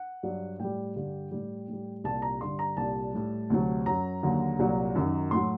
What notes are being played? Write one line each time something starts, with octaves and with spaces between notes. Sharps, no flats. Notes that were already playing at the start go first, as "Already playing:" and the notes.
Already playing: F#5
G2 F#3
A2 G3 G5
G2 D3 G3
A2 G3
A2 G3
C2 A#2 G3 A5
A#5
G2 D3 G3 C6
A#5
C2 A#2 G3 A5
A2 G3
D2 C3 F#3
F#2 F#3 A#5
D#2 D3 F#3
C2 A#2 F#3
F#2 D#3 F#3
A2 F#3 C6